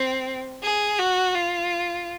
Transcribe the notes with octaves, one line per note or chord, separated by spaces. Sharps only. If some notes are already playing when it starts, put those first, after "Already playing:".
Already playing: C4
G#4
F#4
F4